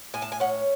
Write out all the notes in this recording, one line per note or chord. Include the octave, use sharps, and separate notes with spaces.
A2 G#5
A5
G#5
C#4 F#5